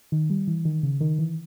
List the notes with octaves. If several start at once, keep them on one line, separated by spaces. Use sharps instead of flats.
D#3
G3
E3
D#3
C#3
D#3
E3